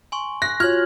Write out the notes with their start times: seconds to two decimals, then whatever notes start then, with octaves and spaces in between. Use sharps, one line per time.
0.12 G#5 C6 C#6
0.42 F#6 A#6
0.60 F4 F#4 C#5 F6 G#6 F#7